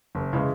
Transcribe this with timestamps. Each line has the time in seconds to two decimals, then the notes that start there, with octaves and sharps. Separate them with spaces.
0.15 F#1
0.33 C#3 E3 G#3